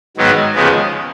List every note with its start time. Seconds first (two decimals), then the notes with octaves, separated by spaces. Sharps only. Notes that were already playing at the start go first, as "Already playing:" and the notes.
0.17 G#2 D#3 F#3 B3
0.55 D#2 C#3 F3 G#3 B3